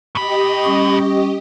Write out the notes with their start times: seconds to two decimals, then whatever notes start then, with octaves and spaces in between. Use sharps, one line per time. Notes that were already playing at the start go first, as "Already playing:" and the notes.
0.15 A2 G4 D#5 B5
0.64 G3 C#4 C#6